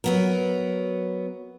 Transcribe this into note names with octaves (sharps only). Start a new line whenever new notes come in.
F#3 B3 A#4